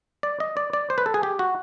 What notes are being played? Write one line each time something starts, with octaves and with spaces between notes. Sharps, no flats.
D5
D#5
D5
D5
C5
B4
A4
G#4
G4
F#4